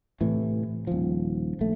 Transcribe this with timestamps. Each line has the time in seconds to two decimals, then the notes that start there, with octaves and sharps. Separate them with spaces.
0.21 A2 C3 E3
0.87 D#1 F3
1.61 A#1 A3